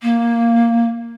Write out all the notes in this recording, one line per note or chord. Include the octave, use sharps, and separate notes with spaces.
A#3